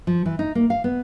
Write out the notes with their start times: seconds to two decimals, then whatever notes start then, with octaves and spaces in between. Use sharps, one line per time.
0.07 F3
0.26 E3
0.39 D#4
0.55 A#3
0.70 F5
0.84 B3